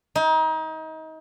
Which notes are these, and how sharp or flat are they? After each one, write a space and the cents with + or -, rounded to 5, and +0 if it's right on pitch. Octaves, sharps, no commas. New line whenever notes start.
D#4 +30